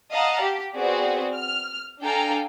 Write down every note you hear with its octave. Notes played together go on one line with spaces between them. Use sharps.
D#5 F5 F#5 A5 A#5
G4
B3 C4 F#4 G#4 D5
F6
D4 A4 F5 G5 G#5 A#5